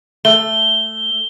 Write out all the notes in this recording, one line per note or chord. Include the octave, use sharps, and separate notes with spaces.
A3 G7